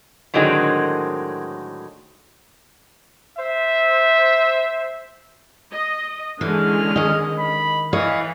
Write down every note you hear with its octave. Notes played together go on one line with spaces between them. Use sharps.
A2 D3 D#3 F#3 G#3 C4
C5 E5
D#5
D3 E3 G#3 C#4 F6
D#3 D#5
B5
E3 C#5 D#5 F5